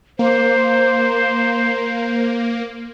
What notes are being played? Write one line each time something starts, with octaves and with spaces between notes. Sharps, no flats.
A#3 C5